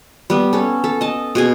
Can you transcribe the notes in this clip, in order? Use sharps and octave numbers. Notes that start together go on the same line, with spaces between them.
G3 B3
C#4 A4
A4
D#5 A5
B2 G#4 G#5